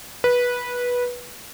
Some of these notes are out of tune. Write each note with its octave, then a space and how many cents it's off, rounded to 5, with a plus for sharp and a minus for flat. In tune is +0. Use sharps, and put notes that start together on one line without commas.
B4 -15